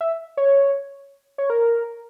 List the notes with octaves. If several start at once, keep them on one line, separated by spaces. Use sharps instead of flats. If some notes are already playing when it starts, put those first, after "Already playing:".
E5
C#5
C#5
A#4